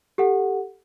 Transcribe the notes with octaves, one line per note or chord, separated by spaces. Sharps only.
G4 A4 F#5